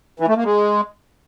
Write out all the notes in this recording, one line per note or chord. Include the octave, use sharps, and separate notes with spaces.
E3
A3
A#3
G#3